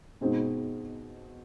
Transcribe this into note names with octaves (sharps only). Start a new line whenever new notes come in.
B2 G#3 C4 D#4 F#4